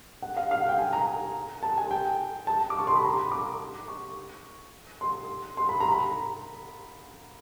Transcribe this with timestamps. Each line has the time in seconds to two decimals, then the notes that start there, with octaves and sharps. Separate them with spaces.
0.22 F#5
0.37 F5
0.51 F5
0.60 F#5
0.69 G5
0.79 G#5
0.93 A#5
1.63 A5
1.78 G#5
1.91 G5
2.47 A5
2.70 D6
2.79 C#6
2.87 C6
2.96 B5
3.05 A#5
3.19 B5
3.32 D6
3.88 C#6
5.01 C6
5.57 C6
5.69 B5
5.80 A#5
5.92 B5